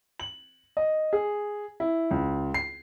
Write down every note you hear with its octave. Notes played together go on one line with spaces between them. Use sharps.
F#7
D#5
G#4
E4
C#2
C7